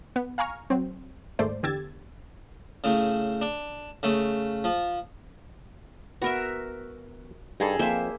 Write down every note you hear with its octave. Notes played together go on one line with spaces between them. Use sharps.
B3
F5 G#5 A#5 C#6 F6
F#3 C4
D#2 G#2 A3 C5 D5
E2 D3 G4 E6 G#6 A6
A2 C#3
D4
C#3 A3
F3
B3 F#4 A#4 E5
G2 D#4 G#4 A4
F2 A#3 C5 E5 F5